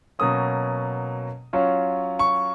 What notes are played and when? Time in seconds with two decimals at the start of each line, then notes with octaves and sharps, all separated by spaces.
0.19 B2 F#3 A#3 C#4 D#6
1.53 F#3 C#4 F4
2.19 C#6